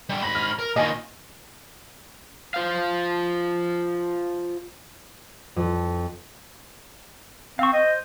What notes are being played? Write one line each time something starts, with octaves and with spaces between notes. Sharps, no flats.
D3 G3
G#2 B5 A#6
F6
A#4
A#2 D#3 D#5 G#5
F4 C5 F5
F2
C4 F5 C#6
C5 D#5